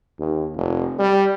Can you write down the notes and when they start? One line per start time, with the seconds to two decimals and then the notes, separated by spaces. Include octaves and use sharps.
0.20 D#2
0.56 F1
0.99 G3